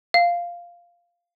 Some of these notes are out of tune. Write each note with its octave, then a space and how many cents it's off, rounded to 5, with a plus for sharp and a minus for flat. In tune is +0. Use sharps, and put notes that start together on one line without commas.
F5 -5